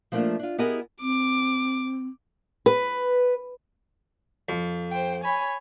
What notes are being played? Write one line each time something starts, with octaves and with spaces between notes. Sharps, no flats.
F3 A3 A#3 C#4 D4 F4
D4 F4
B3 E4 G4 G#4 A#4 D#5
C4 D6
B4
F2
C5 G5
C#5 G#5 B5